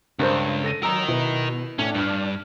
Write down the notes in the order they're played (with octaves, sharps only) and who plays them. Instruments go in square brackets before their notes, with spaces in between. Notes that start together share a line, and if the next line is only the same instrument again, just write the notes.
[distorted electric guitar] C#2 [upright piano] G2 A#4 C5
[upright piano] A4 A#6 D#7
[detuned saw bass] F#3 [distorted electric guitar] A#4 D#5 [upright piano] A#5 E6
[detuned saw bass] B2 [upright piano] E4 B4
[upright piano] A2 F#7 [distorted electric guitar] C#4 [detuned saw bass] D4
[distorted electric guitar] G2 [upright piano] F6 F#7